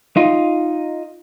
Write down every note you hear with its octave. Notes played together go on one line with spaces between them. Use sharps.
D#4 F4